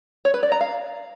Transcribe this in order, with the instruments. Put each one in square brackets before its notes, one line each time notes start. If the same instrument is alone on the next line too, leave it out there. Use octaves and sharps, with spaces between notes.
[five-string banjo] C#5
B4
D5
A#5
F5